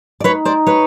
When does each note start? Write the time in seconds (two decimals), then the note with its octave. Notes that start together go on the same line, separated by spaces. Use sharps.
0.20 D5
0.24 D#4 B4 C#5
0.45 C5 D5
0.66 B4 C#5